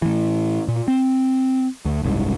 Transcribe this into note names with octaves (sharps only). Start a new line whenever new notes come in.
A2 E3
A#2
C4
D2
F#1 C2 G#2